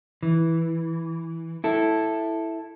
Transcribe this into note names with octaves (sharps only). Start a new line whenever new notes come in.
E3
E4 A4